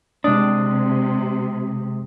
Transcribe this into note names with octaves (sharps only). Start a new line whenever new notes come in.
C3 G#3 D4 D#6